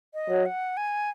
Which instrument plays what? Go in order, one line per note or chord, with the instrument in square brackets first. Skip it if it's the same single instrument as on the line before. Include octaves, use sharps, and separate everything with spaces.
[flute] D#5
[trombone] F#3
[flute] F#5
G#5